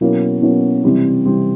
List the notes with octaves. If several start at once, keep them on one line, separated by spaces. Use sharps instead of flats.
B2 F#3 A#3 C#4 E4
B2 F#3 A#3 C#4 E4
C3 E3 G3 C4
C3 E3 G3 C4